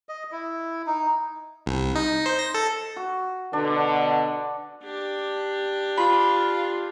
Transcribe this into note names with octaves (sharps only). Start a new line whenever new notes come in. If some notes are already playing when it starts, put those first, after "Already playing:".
D#5
E4
D#4
C2
D#4
C5
A#6
A4
F#4
B2 D3 D4
D4 G4
F4 B5